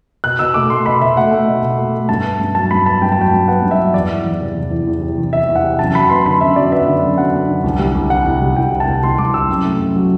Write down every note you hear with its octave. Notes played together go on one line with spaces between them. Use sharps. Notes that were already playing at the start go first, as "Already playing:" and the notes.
B2 F#6
B2 E6
A3 D6
A3 C6
B2 B5
B2 E5
A3 F#5
A3
B2
B2
A3
A3
G2 A5
B3
G2
F#3 A5
G2 B5
B3 A5
G2 G5
A5
F#3 G5
G2
B3 F#5
G2
E5
F#3
E2 D5
E3
E2
C3
E2
E3
E2
C3
E2
E3 E5
E2
F#5
C3
F#2 A5
F#3 B5
B3 C6
D3 B5
F#2 E5
F#3 D5
B3 E5
D3
F#2
F#3 F#5
B3
D3
C2
G3
C2
C3 F#5
C2
G3
C2 G5
C3
A5
C2
G3 C6
C2 D6
C3 E6
F#2
A3
F#2
F#3